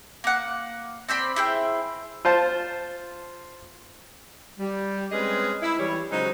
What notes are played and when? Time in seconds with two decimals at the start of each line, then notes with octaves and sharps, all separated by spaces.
0.24 A#3 F#5
1.09 C4 C5 D5 B5
1.36 E4 G#4 C5 G5
2.25 F4 C5 A5
4.59 G3
5.11 G#3 C4 C#4 G#4 B4 D#5
5.62 E4
5.79 E3 G3 C#5
6.11 C#3 F#3 G#3 D#4 C5